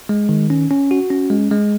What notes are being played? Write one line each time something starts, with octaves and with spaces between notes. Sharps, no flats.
G#3
D#3
C#4
C#4
F#4
C#4
G#3
G#3